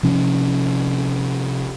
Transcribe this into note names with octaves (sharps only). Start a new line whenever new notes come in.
C3 F3 C#4